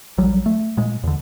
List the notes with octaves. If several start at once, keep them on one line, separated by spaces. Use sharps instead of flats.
A#1 F#3 G3
A3
A#2 G#3
E2 D3